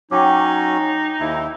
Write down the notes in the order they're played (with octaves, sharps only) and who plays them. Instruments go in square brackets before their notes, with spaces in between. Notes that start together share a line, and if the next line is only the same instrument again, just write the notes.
[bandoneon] F#3 C#4 [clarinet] D#4 [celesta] G5 D6
[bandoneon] D#2 E4